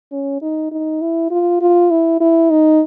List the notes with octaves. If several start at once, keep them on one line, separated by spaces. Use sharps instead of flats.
C#4
D#4
D#4
E4
F4
F4
E4
E4
D#4